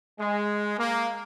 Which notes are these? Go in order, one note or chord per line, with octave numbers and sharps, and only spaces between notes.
G#3
A#3